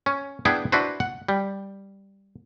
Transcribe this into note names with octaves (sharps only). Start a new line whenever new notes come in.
C#4
B3 D4 E4 G#4 G5 G#5
D4 E4 F#4 B4 C5
F#5
G3